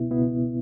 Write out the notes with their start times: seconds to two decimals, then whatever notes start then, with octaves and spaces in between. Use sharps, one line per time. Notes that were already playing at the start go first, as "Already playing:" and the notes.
Already playing: C#2 B2 B3 E4
0.10 C#2 B2 B3 E4